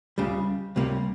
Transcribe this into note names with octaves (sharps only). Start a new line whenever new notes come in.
C#2 C#3 G3
C#2 C3 G3 A#3